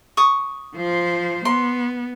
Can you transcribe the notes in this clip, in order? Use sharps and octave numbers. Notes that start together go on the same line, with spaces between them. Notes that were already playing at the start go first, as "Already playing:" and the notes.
C#6 D#6
F3 C5
B3 C6